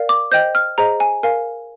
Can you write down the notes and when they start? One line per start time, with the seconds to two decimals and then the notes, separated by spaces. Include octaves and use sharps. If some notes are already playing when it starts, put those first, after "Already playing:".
Already playing: A#4 D5 F5
0.09 D6
0.32 C5 D#5 G5 G6
0.55 F6
0.78 G#4 C5 D#5 A#5
1.00 G#5
1.23 A#4 F5 G#5